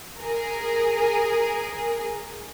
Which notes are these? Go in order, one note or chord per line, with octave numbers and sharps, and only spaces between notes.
G#4 A#4